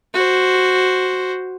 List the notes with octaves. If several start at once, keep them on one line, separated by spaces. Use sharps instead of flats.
F#4 C5